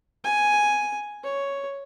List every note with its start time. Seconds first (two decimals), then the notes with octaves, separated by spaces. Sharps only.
0.24 G#5
1.24 C#5